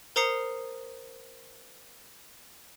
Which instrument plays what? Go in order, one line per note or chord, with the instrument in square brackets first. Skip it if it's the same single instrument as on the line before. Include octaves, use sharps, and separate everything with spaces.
[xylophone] A#4 C5 A#5 D#6 C7 C#7